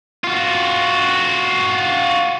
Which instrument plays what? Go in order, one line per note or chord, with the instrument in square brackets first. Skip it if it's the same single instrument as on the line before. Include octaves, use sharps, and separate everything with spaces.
[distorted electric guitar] F4 F#4